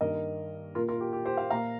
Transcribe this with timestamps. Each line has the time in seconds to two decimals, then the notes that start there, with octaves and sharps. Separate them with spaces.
0.01 G2 D#3 A#3 A#4 D#5
0.75 A#2 A#3 F4 A#4
0.88 F4 A#4
1.01 G4
1.13 G4
1.25 G4 C5
1.37 C5 F5
1.50 A#2 A#3 F5 A#5